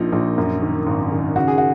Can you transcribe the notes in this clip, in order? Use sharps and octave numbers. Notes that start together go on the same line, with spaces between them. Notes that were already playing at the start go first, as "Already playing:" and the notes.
Already playing: A#1 A#2 F3 D#4
A#1
F#2
D#3
G#1
D#3
C#3 F#4
G#4
F#4